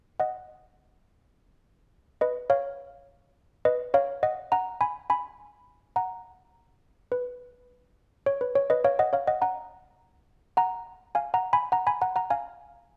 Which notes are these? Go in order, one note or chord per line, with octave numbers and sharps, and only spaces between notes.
D#5 F#5
B4 D#5
C#5 F5
B4 D#5
C#5 F5
D#5 F#5
F#5 A#5
G#5 B5
G#5 B5
F#5 A#5
B4
C#5
B4
C#5
B4 D#5
C#5 F5
D#5 F#5
C#5 F5
D#5 F#5
F#5 A#5
F#5 A#5
F5 G#5
F#5 A#5
G#5 B5
F#5 A#5
G#5 B5
F#5 A#5
F#5 A#5
F5 G#5